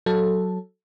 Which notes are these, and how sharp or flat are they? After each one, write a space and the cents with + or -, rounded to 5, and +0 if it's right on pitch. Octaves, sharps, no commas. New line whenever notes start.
F#3 +0 A4 +0